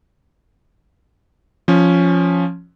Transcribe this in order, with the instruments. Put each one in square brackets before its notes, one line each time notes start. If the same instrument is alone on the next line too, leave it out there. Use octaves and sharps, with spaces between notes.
[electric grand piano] F3 C#4